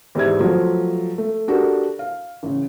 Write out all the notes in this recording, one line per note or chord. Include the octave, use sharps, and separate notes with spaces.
E2 G#2 E4 G4 E5 G#6
F3 F#3 A3 B3 F4 F#4
A3
D4 F#4 G4 A4 A#4
F5
A1 C#3